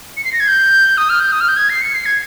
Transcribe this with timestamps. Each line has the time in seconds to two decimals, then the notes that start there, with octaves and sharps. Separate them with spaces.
0.17 C#7
0.25 C7
0.33 A#6
0.40 G#6
0.48 G6
0.98 D#6
1.09 F6
1.20 G6
1.32 D#6
1.41 F6
1.48 G6
1.57 G#6
1.70 C7
1.82 C#7
1.94 C7
2.06 G#6